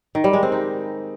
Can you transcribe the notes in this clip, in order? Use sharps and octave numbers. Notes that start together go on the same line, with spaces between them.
D#3
G3
G#3
C4
D#4